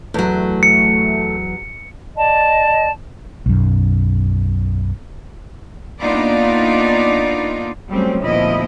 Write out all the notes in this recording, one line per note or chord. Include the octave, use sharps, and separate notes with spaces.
E2 F#3 A3
C#7
D5 D#5 A5
B1 F#2
A#3 B3 D4 D#4 F4 D5
F#3 G3 A3 C4 C#4
D2 A#2 F3 B3 E4 D#5